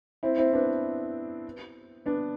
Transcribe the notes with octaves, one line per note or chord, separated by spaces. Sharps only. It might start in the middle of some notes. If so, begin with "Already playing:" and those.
C4 E4
C4 E4
B3 D4
B3 D4